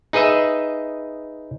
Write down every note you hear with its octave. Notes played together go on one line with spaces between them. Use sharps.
D#4 G#4 B4 D#5 E5